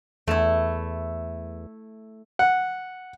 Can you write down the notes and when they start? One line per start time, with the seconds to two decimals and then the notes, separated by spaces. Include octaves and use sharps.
0.27 E2 A3 E4
2.39 F#5